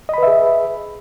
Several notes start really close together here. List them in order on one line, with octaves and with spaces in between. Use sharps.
D#5 B5 B4 E5 G#4